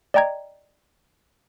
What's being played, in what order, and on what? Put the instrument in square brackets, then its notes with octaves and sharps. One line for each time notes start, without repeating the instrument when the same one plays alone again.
[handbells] D5 D#5 G5 A#5 G#6